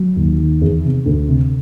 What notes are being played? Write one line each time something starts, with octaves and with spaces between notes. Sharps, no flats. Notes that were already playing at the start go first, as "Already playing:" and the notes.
Already playing: F#3
D#2
D#3
E2
C3
D2
C3